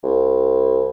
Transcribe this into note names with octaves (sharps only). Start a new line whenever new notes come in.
C2